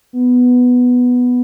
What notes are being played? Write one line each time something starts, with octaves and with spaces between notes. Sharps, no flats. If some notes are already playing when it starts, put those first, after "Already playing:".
B3